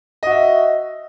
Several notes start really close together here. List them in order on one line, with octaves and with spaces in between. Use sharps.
D#5 F#4 E5